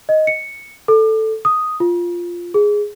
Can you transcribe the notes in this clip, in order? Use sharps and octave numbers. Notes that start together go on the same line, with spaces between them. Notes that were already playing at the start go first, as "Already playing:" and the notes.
D#5
C#7
A4
D#6
F4
G#4